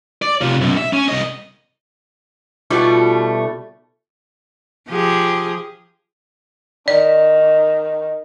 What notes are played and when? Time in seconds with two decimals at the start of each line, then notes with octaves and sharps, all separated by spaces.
0.22 D5
0.41 C3 F4
0.61 B1 F#2
0.77 E5
0.93 C#4
1.08 C2 D#5
2.71 B2 G3 A3 D#4 F4 F#4
4.88 F3 G4 G#4
6.88 D#3 D5